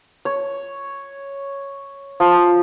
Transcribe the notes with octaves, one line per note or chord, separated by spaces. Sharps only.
C#5
F3